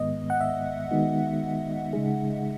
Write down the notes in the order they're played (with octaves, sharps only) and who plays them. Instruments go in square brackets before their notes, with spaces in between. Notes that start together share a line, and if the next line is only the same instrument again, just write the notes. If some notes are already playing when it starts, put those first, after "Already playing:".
Already playing: [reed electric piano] G#2 D#3 G#3 B3 [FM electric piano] D#5
[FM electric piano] F#5
E5
[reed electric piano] D#3 G#3 B3 D#4 F#4
C#3 G#3 D#4 G#4